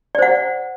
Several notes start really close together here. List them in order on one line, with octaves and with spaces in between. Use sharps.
D5 C5 F#5